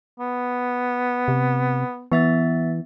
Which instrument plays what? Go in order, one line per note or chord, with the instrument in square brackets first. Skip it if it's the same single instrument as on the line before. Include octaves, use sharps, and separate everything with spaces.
[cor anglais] B3
[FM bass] C3
[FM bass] E3 [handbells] B3 E5 A6